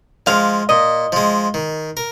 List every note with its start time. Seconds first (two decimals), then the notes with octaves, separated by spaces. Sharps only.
0.26 F3 G#3 F5
0.69 A#2 D#5
1.12 F3 G#3
1.54 D#3
1.97 A#4